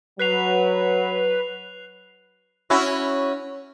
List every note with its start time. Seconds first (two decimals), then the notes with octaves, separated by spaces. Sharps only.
0.19 F#3 B4 F#6 C7 F7
2.70 C#4 E4 F#4